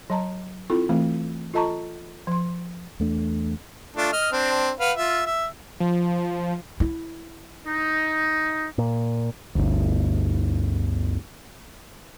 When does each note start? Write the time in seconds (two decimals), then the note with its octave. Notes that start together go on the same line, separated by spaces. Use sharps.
0.10 F#3 D#5 A5 A#5
0.70 C4 E4 F4 A4
0.89 E3 A3 C4
1.54 F4 A4 D#5 A5 A#5 C#6
2.27 F3 C6
3.00 E2 A3 D4
3.96 A3 D4 F4
4.12 D#5 F6
4.32 C4 D4
4.80 B4 F5 F#5
4.97 F4 E5
5.26 E5
5.80 F3
6.80 E4
7.67 D#4
8.78 A#2
9.55 G1 D2